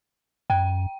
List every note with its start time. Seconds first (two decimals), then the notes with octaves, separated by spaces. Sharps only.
0.50 F#2 G5